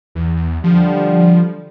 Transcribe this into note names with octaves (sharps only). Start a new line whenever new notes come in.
E2
D3 F3 G3